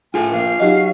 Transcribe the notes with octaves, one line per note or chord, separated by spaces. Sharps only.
A2 F4 G#4 G5 G#5
A#1 F5 G5
F#3 C#4 D#4 G4 D#5